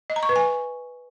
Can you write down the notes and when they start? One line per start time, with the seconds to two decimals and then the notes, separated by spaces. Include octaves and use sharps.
0.10 D#5
0.16 A#5
0.23 C#6
0.29 B4
0.36 G#5